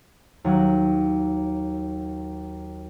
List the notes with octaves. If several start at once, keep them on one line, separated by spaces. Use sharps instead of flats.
D#2 F#3 F#6